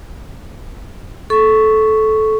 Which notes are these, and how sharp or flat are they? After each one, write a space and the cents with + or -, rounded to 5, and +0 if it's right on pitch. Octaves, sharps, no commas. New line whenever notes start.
A4 -15 C#6 +0